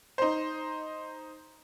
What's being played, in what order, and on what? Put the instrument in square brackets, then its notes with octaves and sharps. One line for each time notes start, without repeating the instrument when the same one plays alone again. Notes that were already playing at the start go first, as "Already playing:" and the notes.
[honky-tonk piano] D#4 C5